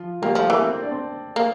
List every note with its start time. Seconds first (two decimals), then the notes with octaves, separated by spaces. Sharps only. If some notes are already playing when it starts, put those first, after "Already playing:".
Already playing: F3 F4
0.22 G3 A#3 G4
0.35 F3 A3 A4
0.49 E3 A#3 A#4
0.62 C4 C5
0.72 C4 C5
0.82 D4 D5
0.92 C4 C5
1.36 A#3